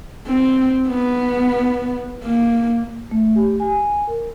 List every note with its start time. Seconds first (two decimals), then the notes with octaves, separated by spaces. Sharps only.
0.27 C4
0.88 B3
2.24 A#3
3.11 A3
3.36 G4
3.60 G#5
4.07 A#4